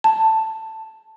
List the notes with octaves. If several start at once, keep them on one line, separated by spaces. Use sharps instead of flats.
A5